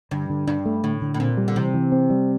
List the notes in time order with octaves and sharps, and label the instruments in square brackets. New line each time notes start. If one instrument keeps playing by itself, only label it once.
[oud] G2 [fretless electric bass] D3
[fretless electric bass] D3
[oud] G2 [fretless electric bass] D4
[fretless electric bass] A3
[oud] A2 [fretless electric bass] D3
[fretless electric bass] D3
[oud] A2
[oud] A#2 [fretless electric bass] C4
[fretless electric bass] G3
[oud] D3
[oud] C3 [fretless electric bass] E3
[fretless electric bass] E3
C4
G3